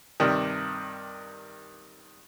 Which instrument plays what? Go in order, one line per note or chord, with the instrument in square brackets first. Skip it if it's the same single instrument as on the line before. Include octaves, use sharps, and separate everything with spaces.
[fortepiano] G2 C3 D#3